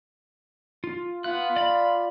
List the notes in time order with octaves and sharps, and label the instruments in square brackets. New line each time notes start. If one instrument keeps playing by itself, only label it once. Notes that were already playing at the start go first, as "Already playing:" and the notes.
[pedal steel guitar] F4
[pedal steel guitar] B3 F#6 [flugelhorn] F4
[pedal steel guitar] D5 B5